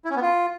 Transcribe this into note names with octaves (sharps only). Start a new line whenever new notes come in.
E4
C#4
B3
F4